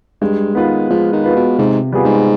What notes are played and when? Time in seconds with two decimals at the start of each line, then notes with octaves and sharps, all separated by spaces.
0.21 G2 G#3
0.55 D#3 B3 F4 B4
0.90 F3 G#3
1.13 D#3
1.24 B3 F4 B4
1.36 B2
1.58 G#2 C3
1.92 G3 B3 F4 G#4
2.05 G#2